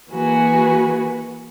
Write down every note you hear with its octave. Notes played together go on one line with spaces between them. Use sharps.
E3 A#3 F#4 G#4 B4